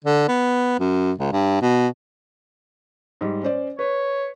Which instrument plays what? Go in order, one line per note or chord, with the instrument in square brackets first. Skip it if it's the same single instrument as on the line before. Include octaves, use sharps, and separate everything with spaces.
[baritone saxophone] D3
B3
F#2
C#2
G2
B2
[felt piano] G#2 G3
C#4 C5 D5
[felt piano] B4 [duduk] C#5